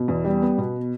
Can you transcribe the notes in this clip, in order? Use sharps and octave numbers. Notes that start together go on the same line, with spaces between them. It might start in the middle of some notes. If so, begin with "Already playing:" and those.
Already playing: B2
E2
G3
B3
B2